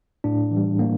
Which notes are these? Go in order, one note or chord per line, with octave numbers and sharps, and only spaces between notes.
A2 D4
E3
G3
A2 A#3